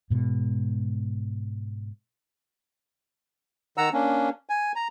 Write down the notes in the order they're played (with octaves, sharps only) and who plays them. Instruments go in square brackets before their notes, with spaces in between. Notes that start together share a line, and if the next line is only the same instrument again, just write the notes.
[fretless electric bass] G#2 B2 G#3
[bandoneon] D#3 F#5 A#5 E6
A#3 C#4 D4
G#5
A#5